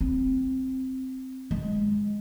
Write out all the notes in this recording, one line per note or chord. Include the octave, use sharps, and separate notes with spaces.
C4
G#3